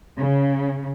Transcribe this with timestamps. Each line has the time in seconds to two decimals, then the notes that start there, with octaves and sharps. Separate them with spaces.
0.18 C#3